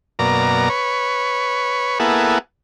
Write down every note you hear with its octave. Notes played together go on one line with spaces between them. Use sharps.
F#2 B2 A#3 D5 A#5
B4 C#5
A#3 B3 E4 G#4 A4 F#5